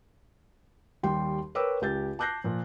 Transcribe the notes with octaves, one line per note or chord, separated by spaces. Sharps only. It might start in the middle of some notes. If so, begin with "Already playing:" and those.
D#2 G3 G5 C6
A#4 B4 C#5 G5 D6 E6
C#2 G4 G6 A6
A5 D6 F#6 G6 A#6 C7
A#2 F3